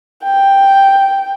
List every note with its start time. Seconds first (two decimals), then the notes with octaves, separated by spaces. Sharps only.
0.24 G5